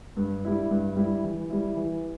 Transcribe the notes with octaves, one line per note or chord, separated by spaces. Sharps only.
G2
G3 E4
G2
G3 E4
E3
G3 E4
E3